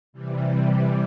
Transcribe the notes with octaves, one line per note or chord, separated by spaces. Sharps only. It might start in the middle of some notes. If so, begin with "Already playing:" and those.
C3 E3 G3